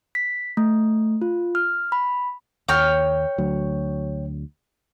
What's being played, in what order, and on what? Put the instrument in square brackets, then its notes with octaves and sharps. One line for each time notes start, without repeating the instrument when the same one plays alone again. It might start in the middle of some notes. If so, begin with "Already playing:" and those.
[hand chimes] B6
A3
F4
F6
B5
[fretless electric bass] D#2 [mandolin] C#5 G5 F6
[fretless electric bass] D2 F#3